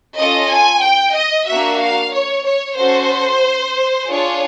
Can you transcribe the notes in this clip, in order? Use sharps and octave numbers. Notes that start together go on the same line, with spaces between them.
C#4 F4 A4 D#5
G#5
G5
D#5
A#3 D4 F#4 E5
F5
C#5
C#5
C#4 F#4 A4 C5
D4 F4 G#4 C#5